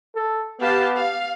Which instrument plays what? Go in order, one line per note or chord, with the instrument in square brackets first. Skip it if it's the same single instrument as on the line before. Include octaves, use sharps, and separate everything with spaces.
[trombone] A4
[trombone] B3 [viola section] G4 F5 A5
[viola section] F5